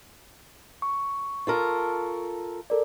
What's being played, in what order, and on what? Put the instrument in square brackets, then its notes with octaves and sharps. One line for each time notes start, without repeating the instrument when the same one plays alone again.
[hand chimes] C#6
[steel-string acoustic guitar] F4 A4 A#4
[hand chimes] A4 A#4 D5